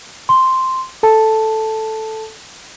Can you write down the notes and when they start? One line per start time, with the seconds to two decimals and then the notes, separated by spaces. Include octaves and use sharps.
0.29 C6
1.03 A4 A5